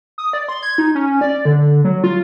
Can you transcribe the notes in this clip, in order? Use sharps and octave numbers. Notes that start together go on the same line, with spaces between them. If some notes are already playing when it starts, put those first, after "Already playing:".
D#6
D5
C6
G#6
D#4
C#4
D5
D3
F#3
F4